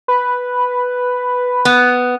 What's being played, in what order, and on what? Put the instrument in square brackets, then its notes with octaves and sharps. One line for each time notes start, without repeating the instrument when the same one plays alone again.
[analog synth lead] B4
[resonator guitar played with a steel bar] B3